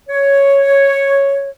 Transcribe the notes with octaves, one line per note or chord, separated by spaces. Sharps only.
C#5